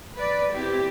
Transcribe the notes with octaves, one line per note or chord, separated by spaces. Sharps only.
B4 D5
C4 E4 G4